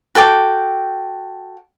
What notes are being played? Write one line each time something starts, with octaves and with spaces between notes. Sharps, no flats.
F#4 A4 G5 D6